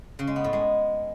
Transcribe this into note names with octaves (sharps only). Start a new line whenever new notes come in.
C#3
G#3
B3
A2
G#3